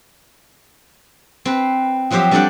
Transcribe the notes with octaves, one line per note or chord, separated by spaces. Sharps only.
C4 B4
F3 F#3 C4 G4 C5 E5
G3 C4 D4 A4 D5 F#5